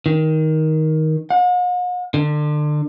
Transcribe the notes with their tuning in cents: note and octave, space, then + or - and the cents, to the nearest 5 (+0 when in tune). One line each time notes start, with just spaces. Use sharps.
D#3 +15
F#5 -45
D3 +30